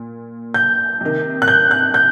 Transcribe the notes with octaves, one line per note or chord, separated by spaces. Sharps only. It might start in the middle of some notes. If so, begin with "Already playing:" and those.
Already playing: A#2
G6
C3 D#3
F#6
G6
F#6
G6